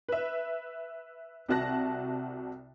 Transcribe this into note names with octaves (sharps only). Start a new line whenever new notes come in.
B4 E5
C2 C3 F#4 A5 F#6 A#6